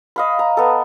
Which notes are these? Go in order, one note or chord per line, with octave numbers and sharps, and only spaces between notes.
D#5 F5 B5
A#5
B3 A4